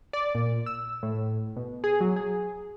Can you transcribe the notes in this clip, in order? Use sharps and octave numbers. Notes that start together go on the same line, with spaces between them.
D5
A#2
E6
A2
B2
G#4
F#3
G#4